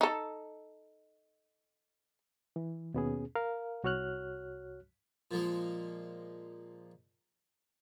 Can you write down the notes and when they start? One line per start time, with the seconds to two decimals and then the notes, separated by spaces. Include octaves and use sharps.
0.01 D#4 A4
2.56 E3
2.94 D#2 B2 B3 C#4 G#4
3.36 A#4 F5
3.84 C2 F#4 C#5 F6 F#6
5.31 A#2 F3 G#3 A#3